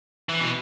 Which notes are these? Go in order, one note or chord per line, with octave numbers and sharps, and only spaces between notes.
E3
B2